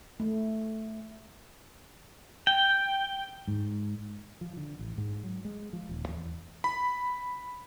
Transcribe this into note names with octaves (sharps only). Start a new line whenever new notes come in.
A3
G5
G#2
F3
D3
A1
G#2
F#3
G#3
F3
D#1
E2
B5